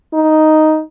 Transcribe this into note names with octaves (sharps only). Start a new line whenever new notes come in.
D#4